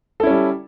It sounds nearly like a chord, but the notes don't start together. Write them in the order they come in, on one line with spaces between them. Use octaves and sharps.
A4 E4 C#4 G3